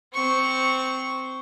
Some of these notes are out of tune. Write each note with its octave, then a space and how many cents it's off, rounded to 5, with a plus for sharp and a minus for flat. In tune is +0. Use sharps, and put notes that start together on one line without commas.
C4 -10 C#6 +0